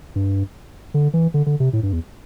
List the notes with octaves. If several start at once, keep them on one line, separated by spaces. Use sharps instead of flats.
G2
D3
E3
D3
D3
C3
A2
G2
E2